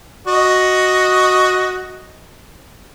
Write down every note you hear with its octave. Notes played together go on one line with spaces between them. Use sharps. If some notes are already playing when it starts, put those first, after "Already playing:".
F#4 D#5